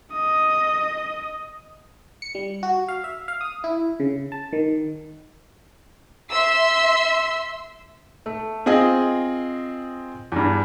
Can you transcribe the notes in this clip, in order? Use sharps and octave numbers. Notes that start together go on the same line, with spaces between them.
D#5 D#6
C#7
G3
F#4
F5
E5
F5
D#6
E4
C#3
A5
D#3
E5 C6 E6
A3
C4 F4 G#4 D#5
E2 G2